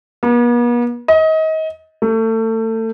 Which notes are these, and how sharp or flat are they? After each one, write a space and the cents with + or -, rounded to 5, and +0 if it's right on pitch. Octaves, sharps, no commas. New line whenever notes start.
B3 -45
D#5 +30
A3 +30